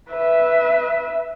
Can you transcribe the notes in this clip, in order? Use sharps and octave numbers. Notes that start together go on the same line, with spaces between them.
B4 E5